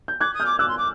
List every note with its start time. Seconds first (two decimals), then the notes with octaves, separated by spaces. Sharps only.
0.08 G6
0.20 D6 F#6 G#6
0.34 D#6
0.40 F6 G6
0.46 D6
0.59 D6 E6 F#6
0.68 C6
0.78 D6